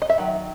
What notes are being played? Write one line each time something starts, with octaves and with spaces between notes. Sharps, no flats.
D#5
E5
D#3 F#3